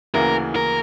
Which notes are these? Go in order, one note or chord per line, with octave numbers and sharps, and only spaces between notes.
D2 C#3 E3 A#3 A#4
A#4